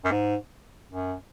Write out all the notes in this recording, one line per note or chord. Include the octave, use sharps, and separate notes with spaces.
F#2
G#2
F#2